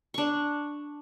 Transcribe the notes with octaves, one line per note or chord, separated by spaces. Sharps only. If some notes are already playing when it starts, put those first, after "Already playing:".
D4 C#6